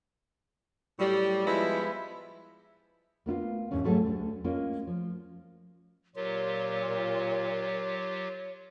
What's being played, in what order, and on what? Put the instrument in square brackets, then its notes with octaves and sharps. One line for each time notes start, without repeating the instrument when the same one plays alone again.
[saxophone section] A2 F#3 G3
F3 G#3 B3 E4
[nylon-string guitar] A#3 B3 E4 F4
D#2 G#2 E3 C#4 D4
G#2 F#3 A3 C#4 G#4 A4
D2 G#2 D3
G#3 A#3 C#4 F4
F3
[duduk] A#2 [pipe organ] F#3 F4 G4 [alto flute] A#4 [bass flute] C#5